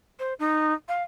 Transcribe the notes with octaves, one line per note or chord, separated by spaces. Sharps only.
C5
D#4
F5